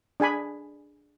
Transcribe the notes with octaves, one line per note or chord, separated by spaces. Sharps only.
D4 G#4 G#5 B5